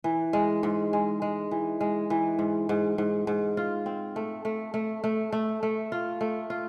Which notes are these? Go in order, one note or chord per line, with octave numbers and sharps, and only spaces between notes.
E3
G#3
G#2
G#3
G#3
E3
G#3
E3
G#2
G#2
G#2
G#2
F4
C4
A3
A3
A3
A3
A3
A3
F4
A3
F4